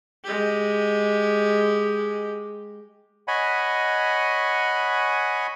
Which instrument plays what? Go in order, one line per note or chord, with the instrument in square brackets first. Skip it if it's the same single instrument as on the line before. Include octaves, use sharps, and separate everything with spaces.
[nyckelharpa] G#3 G4
[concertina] C#5 D#5 F#5 G#5 B5